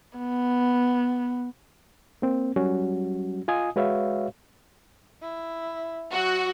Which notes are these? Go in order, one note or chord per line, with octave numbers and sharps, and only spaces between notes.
B3
A#3 C4
F#3 G3 C#4 F#4
F4 D#5 G#5 D#6
G#3 F#4 B4 C#5 E5 F5
E4
F#3 F#4